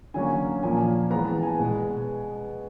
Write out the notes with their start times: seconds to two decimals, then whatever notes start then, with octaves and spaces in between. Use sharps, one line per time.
0.14 D3 F#3 A#3 C#4 G#5
0.63 A#2 F3 A#3 G#5
1.10 E3 G#3 B3 A#5
1.27 A5
1.43 G#5
1.59 B2 G#3 B3